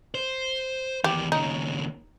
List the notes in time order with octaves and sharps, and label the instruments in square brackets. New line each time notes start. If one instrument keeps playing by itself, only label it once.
[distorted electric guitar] C5
[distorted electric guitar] E2 D#3 [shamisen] G4
[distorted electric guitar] D#2 C#3 [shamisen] D#4